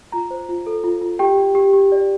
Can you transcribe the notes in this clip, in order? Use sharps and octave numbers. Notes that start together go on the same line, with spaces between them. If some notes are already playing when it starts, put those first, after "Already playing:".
F4 A#5
C5
F4
A4
F4
F4
G4 G5
G4
G4
G4
D5